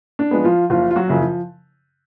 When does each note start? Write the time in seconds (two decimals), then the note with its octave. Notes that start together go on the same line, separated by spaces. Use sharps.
0.19 D4
0.31 F3 G#3 B3
0.44 F3 F4
0.70 F#1 F3 F4
0.91 F4
0.96 F#3 F#4
1.08 F#2 C#3 F3
1.21 F3